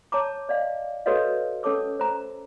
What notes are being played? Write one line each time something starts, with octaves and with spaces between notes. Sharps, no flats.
C#5 A5 A#5 D6
D5 D#5 F5 G#5
F#4 A4 B4 C#5 D#5 F5
C#4 A4 C#5 A5 D6 E6
C5 A#5